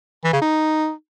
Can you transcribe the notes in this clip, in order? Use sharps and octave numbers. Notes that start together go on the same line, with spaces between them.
E3
C#3
D#4